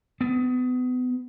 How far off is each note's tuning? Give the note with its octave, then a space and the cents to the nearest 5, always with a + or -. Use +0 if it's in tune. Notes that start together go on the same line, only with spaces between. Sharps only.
B3 +30